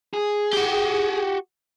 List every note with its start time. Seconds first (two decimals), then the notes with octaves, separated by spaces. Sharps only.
0.14 G#4
0.53 F#4 G4